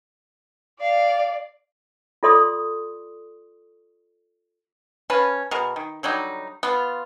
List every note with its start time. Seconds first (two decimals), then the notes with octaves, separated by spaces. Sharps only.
0.81 D5 F5
2.23 F4 A4 D5 C6 D6 D#6
5.10 C#4 B4 F5 A5
5.51 B2 G#4 A#4
5.76 D#3
6.03 D3 F#3 G3 D#4
6.63 B3 F4